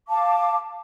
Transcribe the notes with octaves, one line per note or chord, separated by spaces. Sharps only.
F5 A5 D6